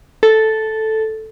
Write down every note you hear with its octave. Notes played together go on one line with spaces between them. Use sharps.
A4